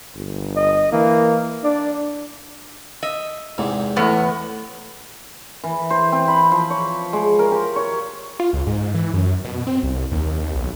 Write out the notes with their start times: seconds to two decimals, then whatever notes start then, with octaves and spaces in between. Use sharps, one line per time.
0.15 G1
0.56 D#5
0.92 E3 A#3
1.64 D4 D5
3.03 D#5 E5
3.58 E2 G#2 C3
3.96 E2 A2 B3
5.64 E3
5.90 C5
6.12 C4
6.28 B5
6.52 F3
6.70 C#5
7.13 G#3
7.39 A#4
7.52 G4
7.76 C#5
8.40 F4
8.53 C#2
8.67 G#2
8.94 E3
9.14 F#2
9.45 B2
9.67 C4
9.83 C2
10.12 D#2
10.55 B1